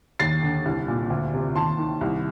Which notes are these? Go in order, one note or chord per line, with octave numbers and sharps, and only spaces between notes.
D#2 A6 C7
D3
C2
A#2
D2
C3
D#2 A5 C6
D#3
C2